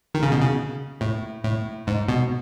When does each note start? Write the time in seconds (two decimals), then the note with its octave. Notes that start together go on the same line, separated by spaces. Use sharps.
0.14 D#3
0.23 C#3
0.32 B2
0.41 C#3
1.01 A2
1.44 A2
1.87 G#2
2.08 B2